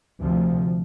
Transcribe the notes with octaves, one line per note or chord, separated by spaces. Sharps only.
D2 C3 F3